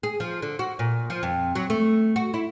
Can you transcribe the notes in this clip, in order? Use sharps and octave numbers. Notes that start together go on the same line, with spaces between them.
G#4
F3
D3
F#4
A#2
F3
F2
F#3
A3
F#4
E4